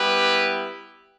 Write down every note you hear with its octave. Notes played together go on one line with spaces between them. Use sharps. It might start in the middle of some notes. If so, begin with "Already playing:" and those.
Already playing: G3 B3 E4 G4 B4